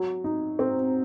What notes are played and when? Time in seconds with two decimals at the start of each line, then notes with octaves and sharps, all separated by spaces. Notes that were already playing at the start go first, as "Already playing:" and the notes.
Already playing: F#3
0.24 D#4
0.59 C4